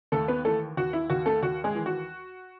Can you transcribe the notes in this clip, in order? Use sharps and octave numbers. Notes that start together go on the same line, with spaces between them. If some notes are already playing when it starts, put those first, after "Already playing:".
D#2 A3 A4
B3 B4
E3 A3 A4
D#2 F#4
E4
D#2 F#4
A3 A4
D#2 F#4
G#3 G#4
E3
F#4